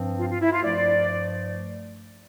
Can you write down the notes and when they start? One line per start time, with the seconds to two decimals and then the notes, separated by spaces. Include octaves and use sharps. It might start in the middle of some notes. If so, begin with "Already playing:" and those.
Already playing: G2 F3 C4
0.18 F4
0.29 F4
0.41 E4
0.52 F4
0.64 G2 F3 A3 D5